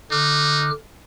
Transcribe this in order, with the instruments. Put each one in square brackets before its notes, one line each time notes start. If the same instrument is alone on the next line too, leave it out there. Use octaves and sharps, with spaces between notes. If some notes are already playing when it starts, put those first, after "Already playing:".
[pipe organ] D3 F6 F#6 [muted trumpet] D#4 [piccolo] D6